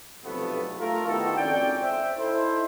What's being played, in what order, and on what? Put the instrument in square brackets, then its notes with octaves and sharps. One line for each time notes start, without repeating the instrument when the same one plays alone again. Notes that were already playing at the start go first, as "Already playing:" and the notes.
[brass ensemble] B1 G2 C3 F3 A3 B3
A3 F4 A#4
D#3 B3 E4 F#4 G4 A4
G#1 F2 C#4 D5 G5
C5 E5
D#4 E4 A4 C5